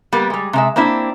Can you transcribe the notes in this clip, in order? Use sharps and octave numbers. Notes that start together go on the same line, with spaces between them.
G3 A#3 B3
G3 G#3
C3 G#3 E5
A#3 C4 D4 E4